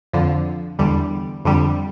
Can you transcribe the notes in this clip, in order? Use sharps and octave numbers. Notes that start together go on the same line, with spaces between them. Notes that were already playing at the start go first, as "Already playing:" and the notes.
F2 D3 F3
E2 D3 G3
F2 D3 G3